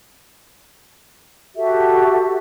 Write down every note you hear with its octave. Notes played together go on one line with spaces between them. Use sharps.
F#4 G4 A4 E5